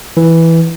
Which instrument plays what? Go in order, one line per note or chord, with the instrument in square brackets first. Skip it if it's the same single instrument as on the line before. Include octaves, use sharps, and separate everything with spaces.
[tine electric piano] E3